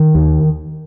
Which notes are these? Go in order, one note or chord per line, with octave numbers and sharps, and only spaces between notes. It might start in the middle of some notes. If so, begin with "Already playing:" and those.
Already playing: D#3
D#2